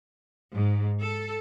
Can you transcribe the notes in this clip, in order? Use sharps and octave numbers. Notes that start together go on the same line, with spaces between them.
G#2
A4